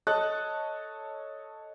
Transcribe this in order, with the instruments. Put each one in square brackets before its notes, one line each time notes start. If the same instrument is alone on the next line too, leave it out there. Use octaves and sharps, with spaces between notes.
[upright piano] A4 C#5 D#5 A5 D#6 F#6